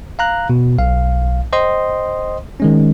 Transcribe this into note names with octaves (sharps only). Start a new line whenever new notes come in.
F5 A#5 F#6
B2
B1 F5
C5 D#5 G5 C6 D#6
D#3 G#3 C#4